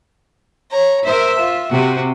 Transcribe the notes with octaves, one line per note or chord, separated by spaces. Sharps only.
C#5 A#5
A#4 C5 E5
F4
C3 F#4